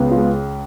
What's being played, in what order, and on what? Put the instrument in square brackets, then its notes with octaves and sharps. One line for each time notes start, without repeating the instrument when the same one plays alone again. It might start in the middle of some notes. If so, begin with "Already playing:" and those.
Already playing: [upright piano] C#2 C#3 [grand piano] B3
[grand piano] F4
[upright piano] G#3